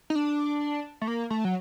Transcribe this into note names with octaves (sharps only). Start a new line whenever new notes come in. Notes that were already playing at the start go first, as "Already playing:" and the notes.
D#4
D4
A3
A#3
A3
F#3